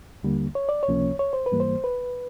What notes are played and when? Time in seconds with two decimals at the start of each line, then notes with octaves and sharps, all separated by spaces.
0.23 D#2 D3 G3 A#3
0.55 C#5
0.69 D5
0.83 C#5
0.88 C#2 C3 F3 A#3 C#4
1.19 C#5
1.33 C5
1.46 B4
1.52 G#2 E3 G3 A#3
1.60 C5
1.84 B4